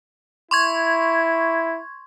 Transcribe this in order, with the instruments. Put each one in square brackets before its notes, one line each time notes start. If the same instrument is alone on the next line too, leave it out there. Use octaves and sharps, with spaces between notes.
[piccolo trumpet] E4 [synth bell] C6 C#6 G#6